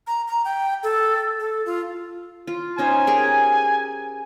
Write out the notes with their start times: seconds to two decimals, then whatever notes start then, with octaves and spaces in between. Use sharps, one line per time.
0.07 A#5
0.28 A#5
0.45 G5
0.83 A4
1.40 A4
1.66 F4
2.47 F4
2.78 C#4 D#4 C5 G#5
3.07 G4 G#4 A#4